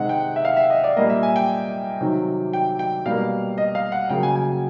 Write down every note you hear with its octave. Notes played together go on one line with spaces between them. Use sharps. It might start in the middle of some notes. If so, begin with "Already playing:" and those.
Already playing: C3 D#3 G#3 F#5
G5
E5
F5
E5
D#5
D5
A#2 G3 A#3 D#5
E5
G#5
G5
C3 D#3 F#3
G5
G5
B2 G3 A#3 F5
D#5
F5
F#5
C#3 F#3 A#3 G5
G#5
G#5